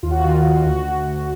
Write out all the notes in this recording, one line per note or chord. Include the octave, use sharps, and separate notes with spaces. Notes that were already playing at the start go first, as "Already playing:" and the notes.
D#2 F4
F#4
F4
D#3
D#2
D2 F#4
D2
D2